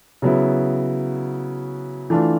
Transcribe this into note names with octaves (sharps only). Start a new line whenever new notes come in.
C#3 F#3 B3 E4
E3 A3 D4 F4